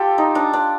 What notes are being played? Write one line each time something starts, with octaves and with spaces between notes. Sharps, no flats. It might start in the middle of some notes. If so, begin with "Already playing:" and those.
Already playing: F4 G4 A4
D#4
D4
D4